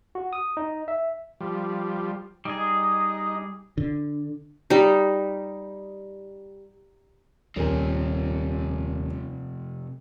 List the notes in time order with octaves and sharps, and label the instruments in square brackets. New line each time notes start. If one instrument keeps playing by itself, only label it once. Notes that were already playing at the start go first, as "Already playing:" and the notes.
[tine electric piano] F#4
D#6
D#4
E5
[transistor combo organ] F3 G3
[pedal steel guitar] G3 G#4 [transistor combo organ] D#4
[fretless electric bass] D3
[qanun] G3 D#4
[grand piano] D#1 A#4 G#5 [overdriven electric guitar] C3 F3